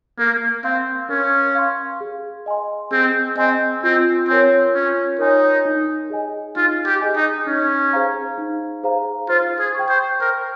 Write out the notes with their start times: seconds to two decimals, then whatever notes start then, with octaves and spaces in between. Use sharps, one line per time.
0.18 A#3 A#4
0.64 C4 F5 C6
1.09 C#4 A#4
1.55 F5 C6
2.01 G#4
2.46 D#5 G#5 C6
2.91 C4 G#4
3.37 C4 D#5 G#5 C6
3.83 C4 F4
4.28 C4 A#4 C#5 G#5 C6
4.74 C#4 F4
5.19 D#4 A#4 C#5 G#5 C6
5.65 D#4
6.10 G#4 D#5 G#5
6.56 D#4 F4
6.86 G4
7.01 G#4 D#5 G#5
7.16 D#4
7.47 C#4 D#4
7.93 G#4 C5 F5 A#5
8.38 D#4
8.83 G#4 C5 F5 A#5
9.29 F4 C5
9.59 G#4
9.75 G5 C#6
9.89 C5
10.20 A#4 C5